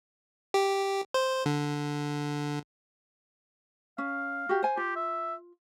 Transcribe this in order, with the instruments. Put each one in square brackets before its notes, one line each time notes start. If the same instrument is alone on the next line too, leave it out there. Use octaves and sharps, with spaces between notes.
[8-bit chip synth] G4
C5
D3
[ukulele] C#4 [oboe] F5
[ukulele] F#4 G4
C5 G#5
[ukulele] F4 [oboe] G4
[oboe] E5